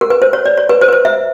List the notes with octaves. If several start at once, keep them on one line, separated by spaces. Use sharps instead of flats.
A#4
B4
C5
C#5
D5
C#5
B4
C5
B4
C5
E5